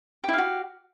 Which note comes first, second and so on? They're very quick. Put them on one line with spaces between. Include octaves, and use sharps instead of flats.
G4 E4 F5 F#4